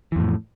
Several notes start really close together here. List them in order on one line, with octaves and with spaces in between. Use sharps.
E3 F2 A2